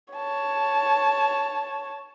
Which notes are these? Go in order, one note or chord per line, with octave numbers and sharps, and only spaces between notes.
C#5 A5